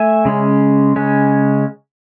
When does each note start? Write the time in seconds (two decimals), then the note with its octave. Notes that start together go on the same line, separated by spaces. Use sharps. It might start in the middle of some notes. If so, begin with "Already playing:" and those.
Already playing: A3 E5 G#5
0.25 C#3 G#3 C#4
0.96 C#3 G#3 C#4